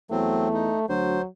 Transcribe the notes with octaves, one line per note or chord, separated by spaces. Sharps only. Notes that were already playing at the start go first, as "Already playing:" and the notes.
E2 F#3 A3 C4
D#4
D2 F#3 C5